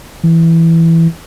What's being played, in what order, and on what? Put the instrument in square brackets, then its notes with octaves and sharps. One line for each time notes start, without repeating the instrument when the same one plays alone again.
[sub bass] E3